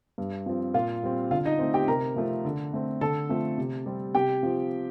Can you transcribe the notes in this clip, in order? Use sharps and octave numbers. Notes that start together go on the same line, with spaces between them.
G2
F3 C4
A#2 F4 F5
G3 C4
D3 F4 F5
D#4 D#5
A3 C4
G4 G5
C3 A#4 A#5
F3 A3 C4
D3
A3 C4
D3 A4 A5
F3 A3 C4
C3
G3 C4
C3 G4 G5
F3 C4